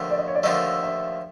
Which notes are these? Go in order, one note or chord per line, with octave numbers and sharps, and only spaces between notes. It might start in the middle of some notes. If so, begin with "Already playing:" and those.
Already playing: D#2 D3 F3 A3
D5
D#5
C#5
D5
D#2 D3 F3 A3 D#5
E5